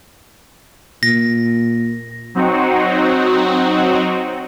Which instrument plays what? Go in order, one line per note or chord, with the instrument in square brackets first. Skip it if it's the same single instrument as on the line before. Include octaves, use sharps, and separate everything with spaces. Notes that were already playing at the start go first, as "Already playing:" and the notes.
[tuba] A#2 [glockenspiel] A#6
[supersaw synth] F#3 C4 D#4 F#4